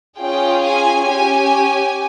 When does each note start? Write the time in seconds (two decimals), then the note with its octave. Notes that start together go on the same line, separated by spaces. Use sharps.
0.18 C#4 F4 G#4 G5
0.63 G#5
1.07 C#4 G4 G#5